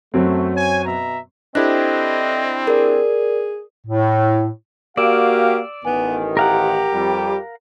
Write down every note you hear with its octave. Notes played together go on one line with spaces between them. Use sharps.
F#2 F#3 A3 C4
C#5 G#5
B2 E5 A#5
C4 D4 E4 G4 A4 C5 D#5 F#6
G#4 A#4 D5
A2
A#3 F#4 G4 D5 F5 E6 D7 E7
A1 D#3 B3 G#5
G4 A#4 F5 F#5 A#5
F2 G3